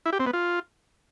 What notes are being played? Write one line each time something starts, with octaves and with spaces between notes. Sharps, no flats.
E4
G4
C4
B3
F4